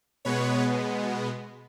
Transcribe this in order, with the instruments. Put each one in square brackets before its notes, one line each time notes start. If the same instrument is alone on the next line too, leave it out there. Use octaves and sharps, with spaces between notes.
[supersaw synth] B2 G#3 B3 B4 C#5